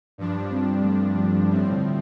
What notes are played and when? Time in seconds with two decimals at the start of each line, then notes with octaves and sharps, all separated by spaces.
0.18 G2 F3 D4
0.51 G3 C4
0.79 G3
0.84 A3
1.17 G3
1.50 A2 F3 C4
1.72 D3